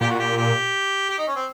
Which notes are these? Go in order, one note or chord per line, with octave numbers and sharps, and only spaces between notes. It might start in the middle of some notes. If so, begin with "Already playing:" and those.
A#2 G4
F#4
G4
G4
G4
D#4
C#4
C4